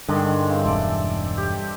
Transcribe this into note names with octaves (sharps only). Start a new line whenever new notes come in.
G2 D3 D#3 G#3
C#3 E3 C4
E1 A4 D5
G4